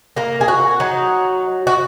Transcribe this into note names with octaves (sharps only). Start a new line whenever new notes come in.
A#3 A#4
G#4
F#4
F#3 D#4
F#4